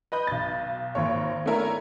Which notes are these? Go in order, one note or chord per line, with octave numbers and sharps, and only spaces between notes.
B4 D#5 B5 G6
B1 A6
G#1 A#3 C#5
A3 B3 C#4 D4 E4 A#4